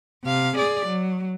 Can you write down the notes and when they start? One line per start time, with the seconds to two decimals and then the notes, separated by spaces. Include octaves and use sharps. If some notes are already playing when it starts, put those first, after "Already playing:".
0.25 C3 F5
0.56 G#4 D5
0.86 F#3